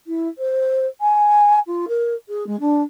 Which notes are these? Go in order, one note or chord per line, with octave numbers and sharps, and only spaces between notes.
E4
C5
G#5
F4
A#4
G#4
G#3
D4